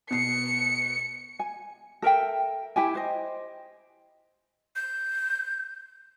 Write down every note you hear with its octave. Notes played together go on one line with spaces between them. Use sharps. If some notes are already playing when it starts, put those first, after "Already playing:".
B2 C7 C#7
G#5
A4 A#4 E5 G5
E4 G4 G#5
C5 D#5
G6